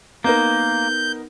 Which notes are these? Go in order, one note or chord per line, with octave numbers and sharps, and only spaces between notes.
A#3 B3 D#4 A#4 G6